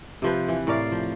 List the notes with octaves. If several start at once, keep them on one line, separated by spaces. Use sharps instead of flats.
C3 F3 B4
E3
A2 A#4 D5 F5
F3